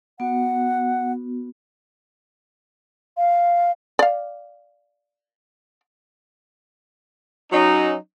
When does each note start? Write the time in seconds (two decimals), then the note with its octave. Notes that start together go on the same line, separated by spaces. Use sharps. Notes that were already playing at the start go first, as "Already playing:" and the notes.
0.20 B3 F#4 F#5
3.17 F5
3.99 D5 F5
7.52 F#3 C#4 D#4